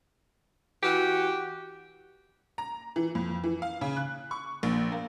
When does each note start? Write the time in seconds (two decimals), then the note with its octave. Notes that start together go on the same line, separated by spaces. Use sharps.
0.83 E3 F#4 G4
2.58 A#5
2.96 E3
3.15 F2
3.44 E3
3.62 F5
3.81 C#3
3.97 F#6
4.31 C#6
4.63 A#1
4.92 A#3